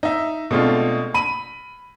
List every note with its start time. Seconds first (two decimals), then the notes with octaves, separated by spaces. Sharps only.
0.03 D#4 E5
0.51 B2 G#3 A3 C4 D4 F4
1.14 B5 D#7